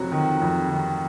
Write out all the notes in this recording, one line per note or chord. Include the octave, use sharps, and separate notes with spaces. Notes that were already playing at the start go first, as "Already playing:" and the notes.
Already playing: F2 C3 F#3 F#4
D#3
F2
D#3